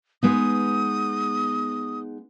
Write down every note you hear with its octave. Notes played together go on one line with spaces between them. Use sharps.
G#3 B3 D#4 D#6